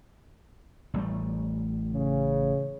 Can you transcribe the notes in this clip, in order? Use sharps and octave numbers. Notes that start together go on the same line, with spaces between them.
A1 G3 A3
C#3